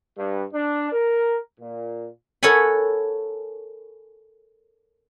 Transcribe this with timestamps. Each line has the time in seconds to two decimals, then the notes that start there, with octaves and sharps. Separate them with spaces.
0.18 G2
0.54 D4
0.92 A#4
1.60 A#2
2.43 A4 A#4 C#5 F#5 G#5 B5